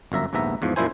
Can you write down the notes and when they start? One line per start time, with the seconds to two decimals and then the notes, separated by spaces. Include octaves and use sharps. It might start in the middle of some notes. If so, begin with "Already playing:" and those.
0.12 G1 F#2 E5 A#5
0.33 A#1 D#2 G#2 B3 E5 A#5
0.62 E2 G#2 F3
0.76 F#2 A#2 F3 E4 C5 G#5